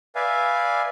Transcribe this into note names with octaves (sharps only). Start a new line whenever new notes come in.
B4 D5 E5 F5 G#5